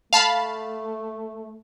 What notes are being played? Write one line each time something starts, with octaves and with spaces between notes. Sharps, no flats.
A3 F5 A5 B5